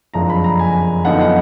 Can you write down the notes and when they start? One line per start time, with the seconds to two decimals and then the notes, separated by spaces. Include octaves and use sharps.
0.14 F#1 F2 F3 G#3 D4 A#5
0.30 B5
0.44 A#5
0.59 G#5
1.05 F#2 D3 F3 B3 D#4 F#5
1.21 F#5